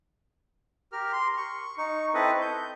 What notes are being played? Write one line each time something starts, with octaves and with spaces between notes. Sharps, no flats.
G4 A#4 F6
C6
C#6
D#4 C#6
C4 E4 A4 B4 D#5
G6